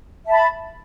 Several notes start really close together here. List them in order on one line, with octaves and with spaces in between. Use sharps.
E5 A5 B5